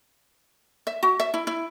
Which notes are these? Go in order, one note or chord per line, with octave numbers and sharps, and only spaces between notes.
E5
F#4
E5
E4
E4